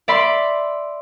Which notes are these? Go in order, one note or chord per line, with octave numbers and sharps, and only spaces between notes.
D5 E5 B5 C6